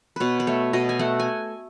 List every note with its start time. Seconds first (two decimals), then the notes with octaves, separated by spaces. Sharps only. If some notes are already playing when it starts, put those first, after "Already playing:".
0.16 B2 B4 C#5
0.40 B4
0.47 A3 C#5
0.73 B2 D#5
0.89 G#5
0.99 A3 F#5
1.20 G#5